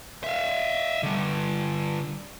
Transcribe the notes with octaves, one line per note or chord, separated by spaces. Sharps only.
E5 F5
D3 G3